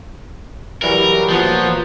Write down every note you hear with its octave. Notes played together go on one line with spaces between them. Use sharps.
E3 F#3 G3 A#4
A#2 F3 F#3 B3